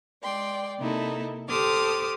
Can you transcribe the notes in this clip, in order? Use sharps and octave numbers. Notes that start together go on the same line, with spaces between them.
G#3 D5 G5 C6
C3 A#3 D#4 E4 A4
G4 A4 C5 D6 D#6 F6